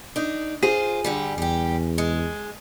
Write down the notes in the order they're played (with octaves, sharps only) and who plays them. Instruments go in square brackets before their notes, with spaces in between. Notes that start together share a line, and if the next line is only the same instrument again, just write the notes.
[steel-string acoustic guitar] D4 D#4
[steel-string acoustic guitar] F4 C5 [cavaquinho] G#4
[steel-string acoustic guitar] G2 D3 G3
[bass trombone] E2 [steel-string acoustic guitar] G3 G4
[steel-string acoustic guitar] G#3